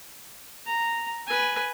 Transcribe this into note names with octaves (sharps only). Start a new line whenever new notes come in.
A#5
B4 G#5